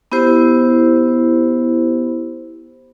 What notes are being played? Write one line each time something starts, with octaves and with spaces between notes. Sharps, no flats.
B3 E4 G4 C5